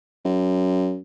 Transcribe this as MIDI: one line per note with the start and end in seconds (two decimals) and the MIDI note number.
0.25 0.98 42